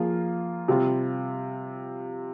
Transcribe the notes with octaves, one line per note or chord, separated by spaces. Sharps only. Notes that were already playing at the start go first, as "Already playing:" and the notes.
Already playing: F3 A#3 F4 G#4
C3 G3 C4 F4